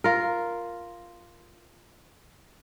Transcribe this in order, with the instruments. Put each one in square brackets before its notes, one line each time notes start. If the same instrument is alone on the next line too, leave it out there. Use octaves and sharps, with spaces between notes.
[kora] F4 A#4